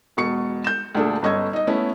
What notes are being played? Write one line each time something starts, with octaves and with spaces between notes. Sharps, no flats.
E1 B2 C#6 C#7
G6 E7
D2 A#2 D4 G#4 A4
G1 C#4 D#5 C#6 E6 G#6
D#4 D#5
A3 B3 C#4 E4